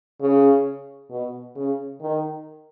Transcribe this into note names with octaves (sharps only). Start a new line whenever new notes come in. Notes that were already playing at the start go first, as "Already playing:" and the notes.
C#3
B2
C#3
D#3